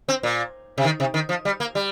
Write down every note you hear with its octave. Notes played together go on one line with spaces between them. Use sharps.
C4
A#2
C3
D#3
C3
D#3
F3
G3
A#3
G3